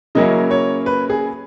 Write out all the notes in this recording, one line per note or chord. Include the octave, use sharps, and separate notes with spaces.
C#3 F#3 A#3 C#4 E4 D#5
C#5
B4
G#4